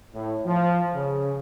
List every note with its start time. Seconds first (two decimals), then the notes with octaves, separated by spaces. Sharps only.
0.15 A2
0.46 F3
0.94 C#3